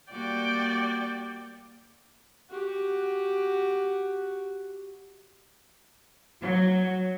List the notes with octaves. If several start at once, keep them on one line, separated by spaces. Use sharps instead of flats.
G3 A#3 F#4 D5 G5
F#4 G4
F#3